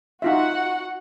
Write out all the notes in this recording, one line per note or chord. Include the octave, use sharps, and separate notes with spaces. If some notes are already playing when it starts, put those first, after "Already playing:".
D#4 F4 F#4 E5 F#5